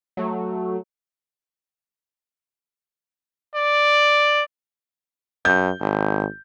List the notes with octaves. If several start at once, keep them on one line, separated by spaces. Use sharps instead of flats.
F#3 A3
D5
F#2 G6
G#1